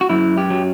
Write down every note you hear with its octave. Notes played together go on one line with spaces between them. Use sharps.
F#4
F#2 E4
G4
F#3